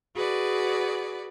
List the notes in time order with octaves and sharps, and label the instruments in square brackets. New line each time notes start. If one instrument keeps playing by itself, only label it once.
[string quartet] F#4 G#4 B4 D5